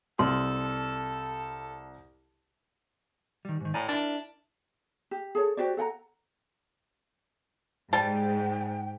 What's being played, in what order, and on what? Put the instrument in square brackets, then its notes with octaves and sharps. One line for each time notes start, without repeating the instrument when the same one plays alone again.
[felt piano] C2 [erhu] A4 [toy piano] C6
[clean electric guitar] D#3 G3
G#2 D#3
[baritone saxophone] A2 [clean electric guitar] D5 G#5 A#5
[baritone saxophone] D4 [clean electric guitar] E4 A#4
[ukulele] G4
G#4 A4 C#5
F#4 G4 C5 D5
A4 F#5 G5 A#5
[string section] G#2 G#3 [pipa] G3 A5 [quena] G5